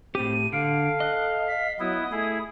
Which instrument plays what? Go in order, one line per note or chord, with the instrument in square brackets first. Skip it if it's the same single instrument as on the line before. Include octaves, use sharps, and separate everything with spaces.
[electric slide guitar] A2 G4 [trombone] C4 [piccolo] D#7
[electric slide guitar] D3 [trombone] A4 [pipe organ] F5 [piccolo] D7
[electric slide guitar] D#5 [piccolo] F#6
[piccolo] B6
[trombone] F#3 [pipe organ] B3 E4 [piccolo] D#6
[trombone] A3 [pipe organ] E4 G#4